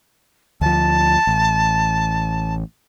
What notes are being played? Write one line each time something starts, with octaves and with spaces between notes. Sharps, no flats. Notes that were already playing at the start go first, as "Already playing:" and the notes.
D2 F3 A5
A1